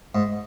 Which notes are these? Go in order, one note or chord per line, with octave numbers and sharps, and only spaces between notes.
G#2